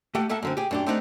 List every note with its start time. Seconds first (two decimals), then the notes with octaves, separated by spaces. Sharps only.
0.15 A3 G4 F#5 G5
0.29 A#3 A4 E5 F#5 A5
0.43 F#2 D3 C4
0.57 G4 G#4
0.71 F#2 D4 G4
0.86 A3 C4 D4 D#4 G4 F#5